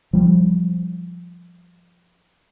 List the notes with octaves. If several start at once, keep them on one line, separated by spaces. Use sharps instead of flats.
F3 G3